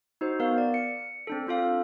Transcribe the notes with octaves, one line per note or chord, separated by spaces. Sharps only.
D#4 F#4 C5
B3 A#4 F5
D5
C#7
C4 D4 A4
C4 F4 A4 F5